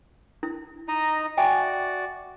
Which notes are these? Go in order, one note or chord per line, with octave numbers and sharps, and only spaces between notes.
E4
D#4 D#5 A#5
F#4 D5 E5 G5 G#5